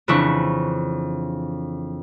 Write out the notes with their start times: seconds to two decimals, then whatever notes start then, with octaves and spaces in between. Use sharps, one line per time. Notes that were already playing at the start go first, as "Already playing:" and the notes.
0.08 F2 C#3 E3 D4 E4 C#6